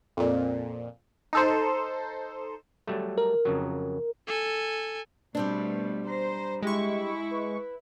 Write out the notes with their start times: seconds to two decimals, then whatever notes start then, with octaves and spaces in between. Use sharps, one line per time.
0.17 F2 A#2
1.33 D#4 A4 C5
2.87 F#3 G3 A3
3.18 A#4
3.45 F2 C#3 F#3
4.28 A4 G#5
5.35 B2 G3 A3 C4 D4
6.06 C5 A#5
6.62 G#3 E4 G4 C#6
7.31 B4